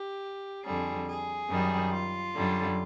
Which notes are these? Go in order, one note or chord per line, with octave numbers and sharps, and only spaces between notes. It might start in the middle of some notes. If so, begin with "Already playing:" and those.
Already playing: G4
F2 D3 G3 G#4
G#4
F#2 D#3 G3
F4
F#2 D3 G3